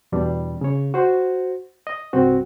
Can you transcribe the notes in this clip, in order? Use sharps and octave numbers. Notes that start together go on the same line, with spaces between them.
E2 B2 G3 D4
C#3 C#5
F#4 C5
D#5
C2 G2 C4 F#4